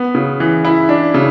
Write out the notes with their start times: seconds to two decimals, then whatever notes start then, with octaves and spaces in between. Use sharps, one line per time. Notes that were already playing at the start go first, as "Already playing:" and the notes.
Already playing: B3
0.15 C#3
0.40 E3
0.65 E4
0.89 D4
1.14 C#3